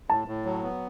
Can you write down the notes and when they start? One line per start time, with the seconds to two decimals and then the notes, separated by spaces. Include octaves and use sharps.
0.09 A2 A5
0.28 A2
0.45 F#3
0.63 B3